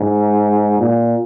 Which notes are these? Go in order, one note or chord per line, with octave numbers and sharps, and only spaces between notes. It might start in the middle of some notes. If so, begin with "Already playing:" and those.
Already playing: G#2
A#2